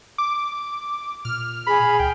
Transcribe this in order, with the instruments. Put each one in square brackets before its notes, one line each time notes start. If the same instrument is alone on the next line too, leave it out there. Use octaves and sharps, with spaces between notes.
[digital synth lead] D6
[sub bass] A#2 [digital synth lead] F6
[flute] G#4 [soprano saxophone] B5
[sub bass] C#2 [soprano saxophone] G5